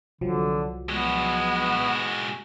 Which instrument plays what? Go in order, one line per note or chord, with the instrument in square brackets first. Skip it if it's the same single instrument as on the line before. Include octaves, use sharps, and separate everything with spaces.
[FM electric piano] C2 F3 F#3 [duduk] D3
[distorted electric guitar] G#3 F#4 [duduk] B3